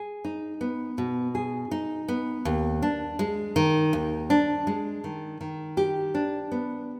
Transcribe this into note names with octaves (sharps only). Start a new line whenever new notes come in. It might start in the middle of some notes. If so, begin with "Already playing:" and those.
Already playing: G#4
D#4
B3
B2
G#4
D#4
B3
D#2
D4
G#3
D#3
D#2
D4
G#3
D#3
D#3
G4
D4
B3